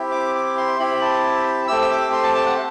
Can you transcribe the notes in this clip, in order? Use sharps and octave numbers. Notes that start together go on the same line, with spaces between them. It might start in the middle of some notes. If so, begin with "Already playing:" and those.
Already playing: C4 E4 G4
D6
D6
C6
C4 E4 G4 B5
A5
A3 C4 G4 E6
E6
D6
C6
A5
A5
F#5